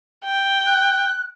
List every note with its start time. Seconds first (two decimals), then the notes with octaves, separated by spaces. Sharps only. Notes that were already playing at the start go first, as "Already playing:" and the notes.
0.24 G5
0.66 F#6